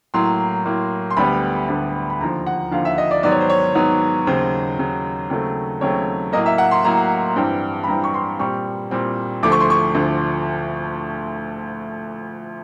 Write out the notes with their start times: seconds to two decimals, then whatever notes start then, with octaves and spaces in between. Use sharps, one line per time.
0.14 A2 F#3 A#3 C6
0.65 A2 F#3 A#3
1.10 C6
1.17 D2 D3 G3 B3 B5
1.68 D2 D3 G3 B3
2.10 B5
2.20 D#2 D3 F3 A#5
2.47 F#5
2.71 D#2 D3 F3 F5
2.85 E5
2.98 D#5
3.11 D5
3.23 G#2 D#3 F#3 B3 D5
3.31 C#5
3.41 C5
3.50 C#5
3.75 G#2 D#3 F#3 B3
4.27 D#2 C#3 F#3 C5
4.79 D#2 C#3 F#3
5.30 D#2 C#3 F#3 A3 C4
5.81 D#2 C#3 F#3 A3 C4 C#5
6.33 A2 F#3 A#3 D#5
6.46 E5
6.58 F#5
6.71 C6
6.84 A2 F#3 A#3 A#5
7.36 G2 E3 G3 C4
7.84 B5
7.88 G2 E3 G3 C4 A#5
8.04 C#6
8.14 C6
8.39 A#2 G3 C4 C#6
8.91 A#2 G3 C4
9.43 D2 D3 F3 A3 D6
9.52 C#6
9.60 C6
9.70 C#6
9.95 D2 D3 F3 A3